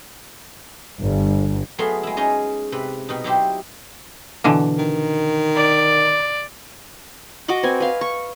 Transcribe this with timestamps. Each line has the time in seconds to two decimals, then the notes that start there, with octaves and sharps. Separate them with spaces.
1.00 G1
1.79 F#3 A3 B3 G#4 F5 C6
2.03 G#3 E4
2.17 C#4 D#4 G#4 D#5
2.72 C3 B4
3.09 B2 D#4
3.24 F#3 D#4 E4 G4 C5
4.44 B2 D3 E3
4.78 D#3
5.56 D5
7.48 F#4 D#5 F#5 D6
7.63 C4 B4 G#5
7.80 B4 F5
8.01 C#6